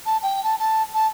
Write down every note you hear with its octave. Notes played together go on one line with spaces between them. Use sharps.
A5
G5
A5
A5
A5